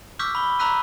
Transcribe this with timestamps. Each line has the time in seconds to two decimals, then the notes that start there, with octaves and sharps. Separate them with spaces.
0.19 C#6 D6 E6 F6 G6 B6
0.35 B5 G7
0.59 A#5 B5 E6 F#6 B6 D#7